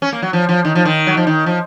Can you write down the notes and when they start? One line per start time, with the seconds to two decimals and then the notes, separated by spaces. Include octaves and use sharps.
0.02 C#4
0.12 A#3
0.22 F#3
0.33 F3
0.49 F3
0.65 D#3
0.75 F3
0.85 D#3
1.07 F#3
1.17 F3
1.27 D#3
1.46 F3